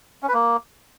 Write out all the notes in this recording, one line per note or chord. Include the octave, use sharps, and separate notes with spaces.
C#4
B4
A#3